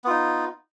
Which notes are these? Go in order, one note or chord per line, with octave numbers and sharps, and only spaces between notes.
B3 D#4 F4